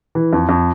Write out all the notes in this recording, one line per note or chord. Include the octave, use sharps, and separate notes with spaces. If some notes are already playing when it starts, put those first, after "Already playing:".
E3
F2
F2